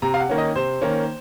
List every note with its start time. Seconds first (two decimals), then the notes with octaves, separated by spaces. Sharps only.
0.02 C3 A#5
0.14 F5
0.20 F#5
0.29 D#3 A#3 C#4
0.38 D#5
0.56 C3 C5
0.81 D#3 A#3 C#4